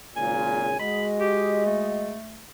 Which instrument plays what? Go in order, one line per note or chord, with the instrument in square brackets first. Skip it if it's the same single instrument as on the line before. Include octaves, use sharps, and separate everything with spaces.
[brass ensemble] G#1 A#2 C#3 [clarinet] G#5
[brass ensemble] G#3 F#4 D#5 [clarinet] B5
[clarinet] G4
A3